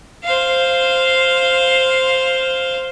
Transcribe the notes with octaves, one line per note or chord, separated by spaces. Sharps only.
C5 F5